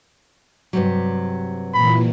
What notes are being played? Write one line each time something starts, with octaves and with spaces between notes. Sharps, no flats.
G2 C3 F#3
A#2 E3 B5